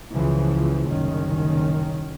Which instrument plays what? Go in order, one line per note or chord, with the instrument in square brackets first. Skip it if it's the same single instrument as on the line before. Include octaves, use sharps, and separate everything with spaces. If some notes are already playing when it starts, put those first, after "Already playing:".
[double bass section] C#2 C#3 E3 F3
F#1 C2 F#2 D#3 C#4